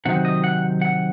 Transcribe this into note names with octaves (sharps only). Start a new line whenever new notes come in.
C3 D#3 F#3 C4 D#4 F#5
D#5
F#5
F#5